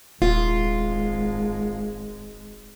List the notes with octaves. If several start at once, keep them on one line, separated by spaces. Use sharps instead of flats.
D#1 G#1 G#3 F4